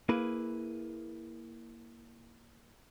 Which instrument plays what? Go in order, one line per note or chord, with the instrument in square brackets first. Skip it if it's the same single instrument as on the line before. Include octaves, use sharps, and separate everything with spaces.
[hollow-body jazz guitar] A#3 E4 G#4 B4